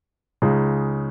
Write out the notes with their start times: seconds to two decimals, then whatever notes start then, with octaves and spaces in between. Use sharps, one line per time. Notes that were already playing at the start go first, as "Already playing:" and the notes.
0.42 C#2 C#3 G#3 D#4